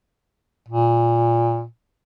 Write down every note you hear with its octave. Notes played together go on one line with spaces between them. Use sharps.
A#2